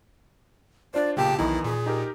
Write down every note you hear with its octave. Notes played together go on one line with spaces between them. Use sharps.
D4 F4 C5 D5
B1 A#2 C#3 G4 G5 A5
B1 E2 D#3 E3 D#4 E4
A#2 G#4
D#4 G4 A#4